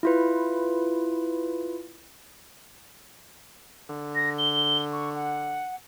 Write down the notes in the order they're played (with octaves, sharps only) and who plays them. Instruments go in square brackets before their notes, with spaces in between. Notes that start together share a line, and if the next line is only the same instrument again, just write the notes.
[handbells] E4 F4 B4
[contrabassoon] D3
[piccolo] A#6
G7
C#6
F#5